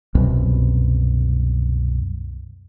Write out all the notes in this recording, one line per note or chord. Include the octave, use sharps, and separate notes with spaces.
C2 F#2 B2